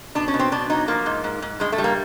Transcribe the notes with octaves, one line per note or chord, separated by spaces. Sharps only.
B2 D4
C#4
B2
C4
B2 D4
F#3 D#4
F3 A#3
G#2
G#2
G#2
G2 G#3
A3
G3
A#3